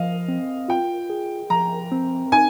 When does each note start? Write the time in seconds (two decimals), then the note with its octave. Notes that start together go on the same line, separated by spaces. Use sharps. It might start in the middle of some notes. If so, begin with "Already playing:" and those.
Already playing: F3 D#5 F5
0.28 C4
0.68 F4 G5
1.10 G#4
1.50 F3 A#5
1.92 C4
2.32 D#4 G#5